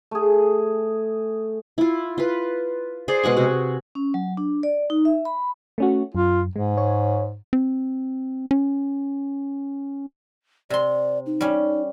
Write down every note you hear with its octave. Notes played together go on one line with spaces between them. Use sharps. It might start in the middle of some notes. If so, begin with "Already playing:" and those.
A3 G#4
E4 F4
F4 B4
G#4 C5 D5
B2 G#3 F#5 C#6
C3 F#4
C#4
F#3
D4
D5
D#4
E5
B5
A3 C#4 F#4
F#2 F4
G#2 G#3
C#5
C4
C#4
C3 D5 C6
D#4
G3 C#4